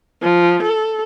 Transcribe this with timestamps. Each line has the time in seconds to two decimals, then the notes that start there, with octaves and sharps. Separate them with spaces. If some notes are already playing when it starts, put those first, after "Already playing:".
0.21 F3
0.61 A4